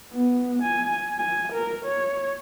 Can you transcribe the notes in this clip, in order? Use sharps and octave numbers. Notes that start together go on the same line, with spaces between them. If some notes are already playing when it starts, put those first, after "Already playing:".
B3
G#5
G#5
A#4
C#5